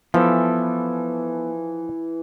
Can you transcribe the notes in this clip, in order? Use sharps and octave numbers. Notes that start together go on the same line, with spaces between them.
E3 F3 B3 A4